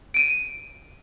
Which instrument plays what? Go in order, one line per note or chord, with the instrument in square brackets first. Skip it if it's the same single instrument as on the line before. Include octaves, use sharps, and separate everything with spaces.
[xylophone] D7 D#7